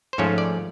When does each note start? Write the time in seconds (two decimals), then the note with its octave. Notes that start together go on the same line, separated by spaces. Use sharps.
0.13 C5
0.18 G#2 F3 A3 C#4 C#5
0.38 D5